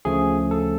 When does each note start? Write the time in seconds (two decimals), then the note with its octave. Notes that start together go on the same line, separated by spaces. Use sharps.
0.05 D2 C#3 F3 A3 G#4
0.51 A4